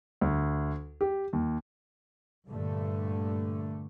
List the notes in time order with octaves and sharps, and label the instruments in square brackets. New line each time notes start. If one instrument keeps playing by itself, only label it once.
[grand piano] D2
G4
D#2
[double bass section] G2 A#2 D3 A3